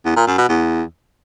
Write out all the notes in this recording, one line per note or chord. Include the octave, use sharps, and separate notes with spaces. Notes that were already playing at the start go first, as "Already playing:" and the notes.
E2
A#2
F#2
B2
E2